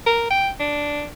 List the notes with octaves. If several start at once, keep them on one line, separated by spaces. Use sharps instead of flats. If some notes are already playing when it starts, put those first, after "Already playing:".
A#4
G5
D4